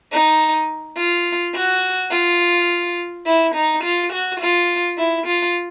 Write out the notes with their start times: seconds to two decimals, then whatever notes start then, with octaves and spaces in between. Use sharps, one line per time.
0.12 D#4
0.97 F4
1.54 F#4
2.11 F4
3.26 E4
3.55 D#4
3.84 F4
4.12 F#4
4.40 F4
4.98 E4
5.27 F4